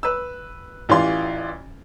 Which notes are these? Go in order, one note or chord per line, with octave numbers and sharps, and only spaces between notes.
B4 E6
A1 E3 F4 G4 D5 C6